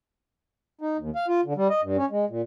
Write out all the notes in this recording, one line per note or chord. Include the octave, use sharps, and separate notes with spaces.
D#4
D#2
F5
F4
D3
G3
D#5
G2
C#4
G#3
A#2